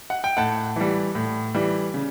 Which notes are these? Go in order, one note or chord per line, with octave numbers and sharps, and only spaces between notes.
F#5
G5
A2 F#5 A5
E3 G3
A2
E3 G3
C#3